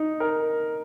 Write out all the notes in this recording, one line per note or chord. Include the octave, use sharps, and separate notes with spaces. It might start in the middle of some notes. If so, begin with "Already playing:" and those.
Already playing: D#4
A#4